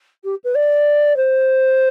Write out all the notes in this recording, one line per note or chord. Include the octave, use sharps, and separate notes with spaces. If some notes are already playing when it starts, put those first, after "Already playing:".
G4
B4
D5
C5